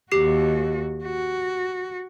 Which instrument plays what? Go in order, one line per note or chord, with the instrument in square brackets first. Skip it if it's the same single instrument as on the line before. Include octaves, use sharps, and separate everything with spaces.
[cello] D#2 F#4 [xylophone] G4 C7
[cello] F#4